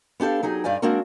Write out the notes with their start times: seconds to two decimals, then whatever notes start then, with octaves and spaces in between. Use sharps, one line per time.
0.20 B3 D4 G4 A4 F5
0.43 F#3 D#4 G4 G#4
0.64 G2 D#4 D5 F5 G#5
0.82 G#3 A#3 C4 D4 F#4 A#4